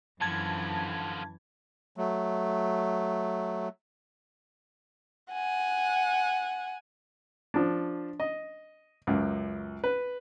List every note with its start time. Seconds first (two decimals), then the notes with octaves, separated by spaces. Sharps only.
0.21 F#2 D3 E3 F3 A5 G#6
1.97 F#3 A3
5.33 F#5 G#5
7.54 F3 D4
8.20 D#5
9.07 C#2 F#2
9.84 B4